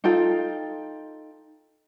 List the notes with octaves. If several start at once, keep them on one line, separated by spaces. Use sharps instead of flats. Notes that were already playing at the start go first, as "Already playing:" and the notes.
D#4 F4 A4 G5